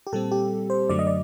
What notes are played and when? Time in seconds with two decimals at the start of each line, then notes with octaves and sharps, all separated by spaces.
0.07 G4
0.13 A#2 G3 C4 A4
0.31 G4
0.70 C5
0.89 F#2 D3 F#3 A3 D5
0.99 D#5
1.07 D5